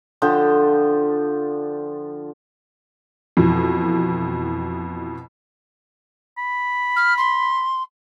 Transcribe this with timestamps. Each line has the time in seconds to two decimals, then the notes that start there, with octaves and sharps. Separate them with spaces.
0.22 D3 F3 G5
3.37 F2 B2 E3
6.37 B5
6.96 F6
7.18 C6